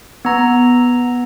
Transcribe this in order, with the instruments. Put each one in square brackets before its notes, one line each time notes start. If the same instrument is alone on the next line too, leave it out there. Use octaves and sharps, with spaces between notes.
[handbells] B3 A#5